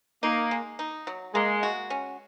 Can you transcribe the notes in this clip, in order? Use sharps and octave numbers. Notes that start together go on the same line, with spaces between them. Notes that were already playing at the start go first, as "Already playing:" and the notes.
A#3 D#4
G#3
D#4
F#3
G#3 A#3
F#4
C#4